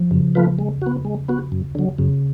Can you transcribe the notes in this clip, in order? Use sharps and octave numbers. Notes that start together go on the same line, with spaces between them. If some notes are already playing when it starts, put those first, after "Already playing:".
Already playing: F3
F#2 C#3
F3 A3 F4 B4
G#3
B3 F#4
G#3
B3 F#4
F#2
D3 F#3
F#2 C#3